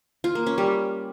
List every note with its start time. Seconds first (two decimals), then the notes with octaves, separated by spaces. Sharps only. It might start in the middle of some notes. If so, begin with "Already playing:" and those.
0.24 F4
0.35 A#3
0.46 C#4
0.58 G3